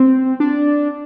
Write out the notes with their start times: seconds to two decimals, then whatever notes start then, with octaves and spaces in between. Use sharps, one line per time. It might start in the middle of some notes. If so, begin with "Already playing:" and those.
Already playing: C4
0.40 D4